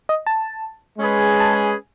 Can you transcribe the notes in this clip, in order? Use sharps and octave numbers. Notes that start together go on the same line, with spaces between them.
D#5
A5
G#3 C#4 G#4 B4
A5
G#5